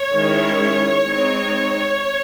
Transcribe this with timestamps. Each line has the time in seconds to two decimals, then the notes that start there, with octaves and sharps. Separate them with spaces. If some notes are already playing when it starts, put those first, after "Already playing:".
Already playing: C#5
0.15 D#3 G#3 C#4 E4
1.05 G#3 C4 D#4